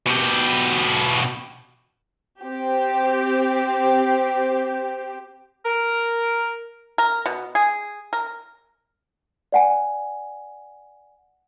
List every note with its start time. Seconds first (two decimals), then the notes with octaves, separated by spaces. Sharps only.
0.07 B2 G4
2.41 C4 G4
5.64 A#4
6.98 A#4
7.26 B2
7.55 G#4
8.13 A#4
9.52 D5 F#5 G#5